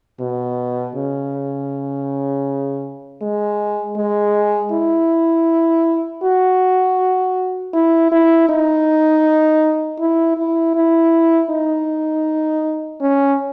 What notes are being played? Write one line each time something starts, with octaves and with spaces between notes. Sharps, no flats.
B2
C#3
G#3
G#3
E4
F#4
E4
E4
D#4
E4
E4
E4
D#4
C#4